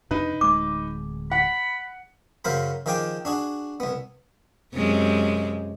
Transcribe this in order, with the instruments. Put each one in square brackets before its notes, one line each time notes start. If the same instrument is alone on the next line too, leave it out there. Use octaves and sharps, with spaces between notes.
[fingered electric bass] F2 C3 D4 [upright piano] D#4 B4
[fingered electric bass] D1 G#3 [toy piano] D6
[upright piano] F#5 [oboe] B5
[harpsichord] F#2 C#3 F#3 A#4 C5 B5
D#3 F3 G#4 G5 D6 D#6
D4 F#4 G#4
C2 B3
[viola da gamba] F#2 C3 G#3